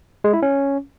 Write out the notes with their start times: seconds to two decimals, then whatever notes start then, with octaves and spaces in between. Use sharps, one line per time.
0.24 G#3
0.33 E4
0.42 C#4